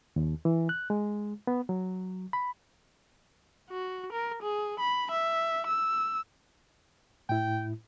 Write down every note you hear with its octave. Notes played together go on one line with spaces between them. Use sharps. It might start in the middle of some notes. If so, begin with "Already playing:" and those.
D#2
E3
F#6
G#3
B3
F#3
B5
F#4
A#4
G#4
B5
E5
E6
A2 E4 G5